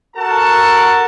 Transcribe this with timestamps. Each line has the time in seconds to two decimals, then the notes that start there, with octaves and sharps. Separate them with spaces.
0.16 F#4 A4 A#4 F#5 A5